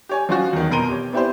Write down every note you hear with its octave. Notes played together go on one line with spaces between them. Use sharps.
G4 C#5 G#5
F3 C#4 F4 F#4
E2 D#3
F2 B2 A#4 C6 D#7 G7
G4 C#5
B3 C4 E4 G4 B4 C5